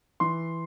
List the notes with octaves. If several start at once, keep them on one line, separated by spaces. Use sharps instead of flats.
E3 C6